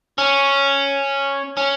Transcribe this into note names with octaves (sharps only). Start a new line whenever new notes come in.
C#4
C#4